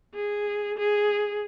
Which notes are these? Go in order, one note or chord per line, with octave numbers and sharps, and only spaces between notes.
G#4
G#4